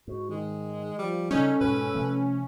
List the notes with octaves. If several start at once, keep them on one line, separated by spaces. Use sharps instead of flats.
G#2 F#4
D#3 G#3
F3 G3
C#3 G3 C#4 D#4 A4
G#2 B2 B4
C3 F3 A3